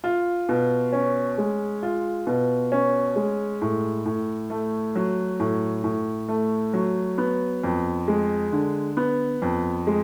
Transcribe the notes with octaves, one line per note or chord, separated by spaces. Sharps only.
F4
B2
C#4
G#3
F4
B2
C#4
G#3
A2
A2
A3
F#3
A2
A2
A3
F#3
B3
F2
G#3
D3
B3
F2
G#3